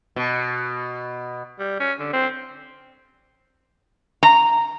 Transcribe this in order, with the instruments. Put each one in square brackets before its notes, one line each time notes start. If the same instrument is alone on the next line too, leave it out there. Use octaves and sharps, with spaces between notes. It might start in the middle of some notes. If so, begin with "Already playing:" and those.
[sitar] B2
[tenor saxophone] G3
C#4
D3
C4
[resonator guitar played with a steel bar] A#5